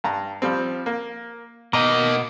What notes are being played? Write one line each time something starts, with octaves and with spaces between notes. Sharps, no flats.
G2 A5 A#5
F3 G3 C4
A#3
B2 A#3 D#4 D#5 A#5